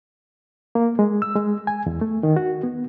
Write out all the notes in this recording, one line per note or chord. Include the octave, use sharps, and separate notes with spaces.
A#3
G#3
E6
G#3
G#5
E2
A3
D#3
F#4
B3